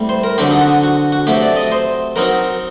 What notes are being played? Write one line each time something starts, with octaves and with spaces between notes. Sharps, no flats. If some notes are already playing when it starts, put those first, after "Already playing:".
Already playing: A2 G3 C4
C5
A#4
D3 F#3 C4 G4
D#4
F#4
F#4
F#4
C3 F#3 A3 G4
D5
D#5
C5
F#3 C4 D#4 A#4